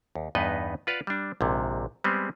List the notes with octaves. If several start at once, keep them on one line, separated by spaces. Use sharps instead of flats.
D#2
E2 G2 B3 D#4 B4 D#5
F4 B4 D5 F5 F#5
G3 D4
A#1 G#2 C3
G3 G#3 B3 C4 G#4